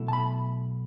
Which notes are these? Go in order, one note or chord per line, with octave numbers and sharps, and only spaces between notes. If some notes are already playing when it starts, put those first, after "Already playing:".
Already playing: B1 B2 A3 E4
A5
B5